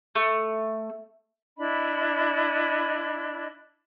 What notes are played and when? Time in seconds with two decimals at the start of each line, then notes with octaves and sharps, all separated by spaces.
0.15 A3
1.58 D4 E4 D#5 B5